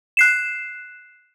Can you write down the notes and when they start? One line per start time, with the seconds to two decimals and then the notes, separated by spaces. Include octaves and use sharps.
0.17 F#6 C7 E7